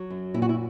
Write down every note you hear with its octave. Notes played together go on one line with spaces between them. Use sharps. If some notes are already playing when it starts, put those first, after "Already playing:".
Already playing: F#3
F#2
A#2 E4
F#4
E4